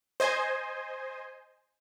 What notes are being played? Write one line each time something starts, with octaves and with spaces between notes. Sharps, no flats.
C5 D#5 G#5